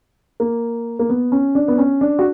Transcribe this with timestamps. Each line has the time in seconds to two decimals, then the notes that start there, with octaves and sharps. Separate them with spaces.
0.40 A#3
0.99 A#3
1.09 B3
1.32 C#4
1.55 D4
1.68 B3
1.78 C#4
2.01 D4
2.19 F#4